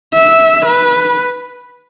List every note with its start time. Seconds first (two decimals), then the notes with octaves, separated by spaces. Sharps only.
0.14 E5
0.66 B4